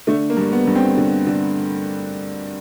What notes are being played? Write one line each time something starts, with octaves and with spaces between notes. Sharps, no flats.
D3 A3
A#3
G2
B3
G2
C4
D3
D3